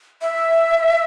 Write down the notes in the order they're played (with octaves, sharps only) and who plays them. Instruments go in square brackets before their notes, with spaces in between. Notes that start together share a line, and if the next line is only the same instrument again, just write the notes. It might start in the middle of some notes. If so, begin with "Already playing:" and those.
[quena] E5